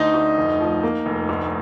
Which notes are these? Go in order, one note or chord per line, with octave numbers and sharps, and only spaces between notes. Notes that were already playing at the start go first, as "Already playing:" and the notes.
Already playing: D2 D3 D#4 D#5
D2
F1
F3
A#3
F1
D2